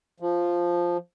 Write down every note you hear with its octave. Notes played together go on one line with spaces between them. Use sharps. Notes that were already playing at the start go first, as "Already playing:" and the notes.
F3